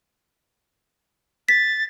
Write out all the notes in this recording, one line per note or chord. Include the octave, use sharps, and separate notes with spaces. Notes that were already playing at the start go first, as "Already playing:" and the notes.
A6 B6